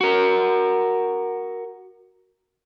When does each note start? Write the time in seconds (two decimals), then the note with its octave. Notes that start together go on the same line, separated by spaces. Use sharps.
0.01 F#4 A#4